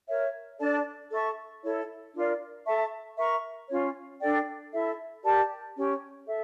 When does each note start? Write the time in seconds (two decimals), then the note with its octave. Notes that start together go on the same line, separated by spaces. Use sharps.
0.08 A#4 C#5 E5
0.59 D4 A4 D5 A5
1.11 A4 E5 A5 C#6
1.63 E4 A4 C#5
2.14 D4 F4 A#4 D5
2.66 A4 E5 A5 C#6
3.18 A#4 E5 A#5 C#6
3.69 C#4 F4 C#5
4.20 D4 A4 D5 G5
4.72 E4 A4 E5
5.23 G4 A#4 D5 A5
5.75 C#4 G4 C#5
6.27 A4 E5